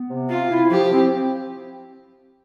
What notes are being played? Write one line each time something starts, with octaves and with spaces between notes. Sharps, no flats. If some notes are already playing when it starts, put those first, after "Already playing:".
Already playing: B3
C3
C4 F4
E4
F3 G4
C4